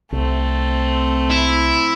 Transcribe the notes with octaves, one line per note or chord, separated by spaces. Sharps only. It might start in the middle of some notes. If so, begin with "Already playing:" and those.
C2 A3 C4
E4